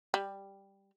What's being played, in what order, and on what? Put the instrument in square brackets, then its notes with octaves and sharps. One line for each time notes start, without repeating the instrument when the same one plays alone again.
[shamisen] G3